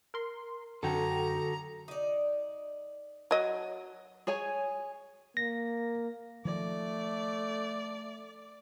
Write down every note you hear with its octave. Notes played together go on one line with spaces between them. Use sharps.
A#4 C6
F#2 D3 F#4 A4 G5 A#5
D#4 D5
F#3 D#5
G#4 C#5 G#5
A#3 A#6
D#3 F3 A3 D5